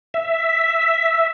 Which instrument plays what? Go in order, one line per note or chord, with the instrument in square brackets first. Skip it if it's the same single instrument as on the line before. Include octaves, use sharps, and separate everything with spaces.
[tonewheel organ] E5